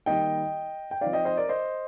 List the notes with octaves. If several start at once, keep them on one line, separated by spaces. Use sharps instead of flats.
D#3 G3 A#3 D#4 D#5 G5
G5
F3 C4 D#4 D5 F5
D#5 G5
C5 D#5
A#4 D5
C5 D#5